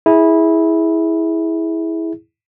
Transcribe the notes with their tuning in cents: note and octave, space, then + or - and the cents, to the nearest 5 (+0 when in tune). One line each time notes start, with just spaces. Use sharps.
E4 -15 G#4 +0